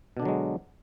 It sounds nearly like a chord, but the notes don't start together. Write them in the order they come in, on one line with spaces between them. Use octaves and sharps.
B2 D4 D3 F#3 G#3